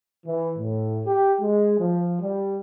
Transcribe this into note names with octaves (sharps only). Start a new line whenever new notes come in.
E3
A2
G4
G#3
F3
G3